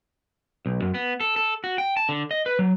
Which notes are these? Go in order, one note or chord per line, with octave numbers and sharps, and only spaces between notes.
B1
F#2
B3
A4
A4
F#4
G5
A5
D3
D#5
B4
F#3